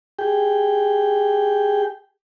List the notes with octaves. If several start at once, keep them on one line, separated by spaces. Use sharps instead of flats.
G4 G#4 G5